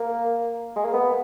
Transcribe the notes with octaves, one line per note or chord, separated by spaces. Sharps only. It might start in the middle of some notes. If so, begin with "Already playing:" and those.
Already playing: A#3
G#3
A#3
B3